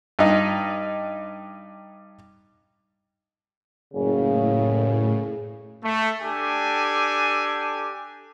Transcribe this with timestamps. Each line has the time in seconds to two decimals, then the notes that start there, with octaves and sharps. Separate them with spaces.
0.19 G2 D#4
3.94 F#1 A2 C#3
5.83 A3
6.22 D4 G4 A4 G#5